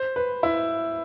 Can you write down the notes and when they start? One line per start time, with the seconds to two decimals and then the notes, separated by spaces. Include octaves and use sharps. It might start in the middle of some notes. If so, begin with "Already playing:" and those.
Already playing: C5
0.16 B4
0.43 E4